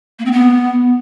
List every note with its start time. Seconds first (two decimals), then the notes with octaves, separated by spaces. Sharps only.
0.19 A#3
0.25 C4
0.32 B3